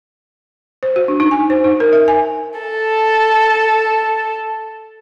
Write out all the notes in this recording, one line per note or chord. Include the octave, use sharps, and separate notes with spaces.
C5
F#4
D4
D#4
G#5
C5
D#4
A#4
E5
G#5
A4 A5